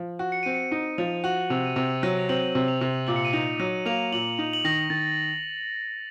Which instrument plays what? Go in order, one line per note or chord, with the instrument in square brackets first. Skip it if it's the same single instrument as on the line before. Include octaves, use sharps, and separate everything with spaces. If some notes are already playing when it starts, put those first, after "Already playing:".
Already playing: [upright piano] F3
F#4
[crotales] C#7
[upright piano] C4 [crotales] D#7
[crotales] C#7
[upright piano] D#4 [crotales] D#7
[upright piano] F3 [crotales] F7
[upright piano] F#4 [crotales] F#7
[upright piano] C3 [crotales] F7
[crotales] D#7
[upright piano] C3 [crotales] F7
[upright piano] F#3 [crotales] D#7
[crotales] F7
[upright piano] C4 [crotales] F#7
[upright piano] C3
[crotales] F7
[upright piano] C3
[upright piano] A#2 [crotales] F#7
[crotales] C#7
D#7
[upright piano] D#4 [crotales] F7
[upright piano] F#3 [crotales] D#7
[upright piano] A#3 [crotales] F7
[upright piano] A#2 [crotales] F#7
[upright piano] D#4 [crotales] F#7
[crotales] F#7
[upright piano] D#3 [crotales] A#6
[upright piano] D#3 [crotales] A6